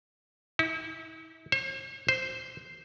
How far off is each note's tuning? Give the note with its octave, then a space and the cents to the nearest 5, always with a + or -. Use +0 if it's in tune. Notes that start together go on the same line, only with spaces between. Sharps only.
E4 -40
C5 +45
C5 -5